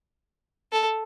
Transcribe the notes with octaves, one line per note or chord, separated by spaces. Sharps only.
A4